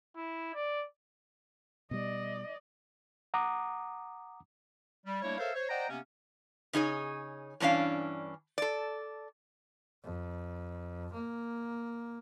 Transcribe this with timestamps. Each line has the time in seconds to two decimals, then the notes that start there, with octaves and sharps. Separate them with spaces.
0.16 E4
0.55 D5
1.91 B2 G3 D5 D#5
3.34 F#5 A#5 D6 D#6
5.06 G3
5.22 G3 A3 A#3 D4 E4 C#5
5.38 A4 A#4 C5 C#5 E5 F5
5.55 C5 C#5
5.69 C5 D5 D#5 F#5 G5 A#5
5.89 C3 A#3 B3 C#4
6.73 C#3 D#4 G#4 C#5
7.60 G2 E3 C#4 D4 F5
8.58 A4 D5
10.04 F2
11.13 A#3